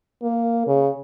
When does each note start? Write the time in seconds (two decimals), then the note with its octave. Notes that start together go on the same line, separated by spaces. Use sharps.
0.22 A#3
0.67 C#3